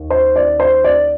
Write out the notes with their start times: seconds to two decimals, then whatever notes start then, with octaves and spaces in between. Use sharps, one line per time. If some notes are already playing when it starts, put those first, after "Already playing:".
Already playing: D#2
0.10 C5
0.36 D5
0.60 C5
0.84 D5